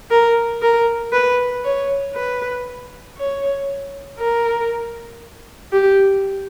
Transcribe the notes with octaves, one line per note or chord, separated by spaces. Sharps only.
A#4
A#4
B4
C#5
B4
C#5
A#4
G4